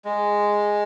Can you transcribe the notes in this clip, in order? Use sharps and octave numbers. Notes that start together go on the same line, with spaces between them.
G#3